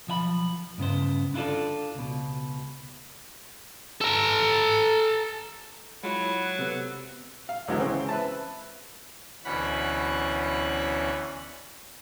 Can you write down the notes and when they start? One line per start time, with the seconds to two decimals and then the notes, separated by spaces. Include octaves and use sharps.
0.07 B1 F3 E5 B5
0.78 G2 C#3 B3 C5
1.34 D4 E4 F4 A4 D5
1.95 C#2 B2
4.01 A4 A#5
6.03 F#3 G#3 E4 F4 C#5 F#5
6.59 C3 B3 A4
7.49 F5
7.68 C#2 D3 E3 F#3 G#3 B3
7.80 C#3 E3 C4 C#4 C5
8.09 B4 E5 A5
9.45 D2 B2 E3 C#4 F#5 B5